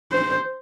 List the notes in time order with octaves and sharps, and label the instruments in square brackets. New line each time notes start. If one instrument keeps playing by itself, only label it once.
[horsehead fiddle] C5